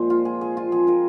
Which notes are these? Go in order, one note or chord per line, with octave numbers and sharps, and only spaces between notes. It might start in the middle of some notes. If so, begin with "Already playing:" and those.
Already playing: A#2 F3 G#3 C4 C5
F4
G#4
G#4
F4
F3 C4 F4 G#4
F4 A#4